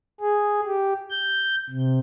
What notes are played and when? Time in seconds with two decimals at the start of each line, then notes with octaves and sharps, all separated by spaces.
0.21 G#4
0.65 G4
1.10 G6
1.70 C3